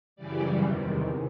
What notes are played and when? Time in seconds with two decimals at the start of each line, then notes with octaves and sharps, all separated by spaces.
0.16 F#2 C#3 E3 G3 D5
0.63 E2 C3 D#3